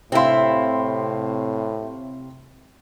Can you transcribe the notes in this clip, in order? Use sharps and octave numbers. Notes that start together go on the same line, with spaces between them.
A2 C3 C4 E4 F5 C6